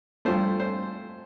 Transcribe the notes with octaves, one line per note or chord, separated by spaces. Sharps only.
G2 F3 A3 C5
C5